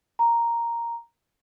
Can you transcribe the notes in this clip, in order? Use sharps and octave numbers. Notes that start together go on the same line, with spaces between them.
A#5